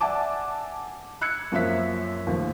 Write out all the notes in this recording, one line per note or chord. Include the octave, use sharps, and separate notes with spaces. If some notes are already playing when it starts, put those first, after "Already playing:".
D5 E5 F#5 G#5 A5 D6
E6 F#6 G#6 C#7
F#2 F3 A#3 E5 B6
A1 D#2 F3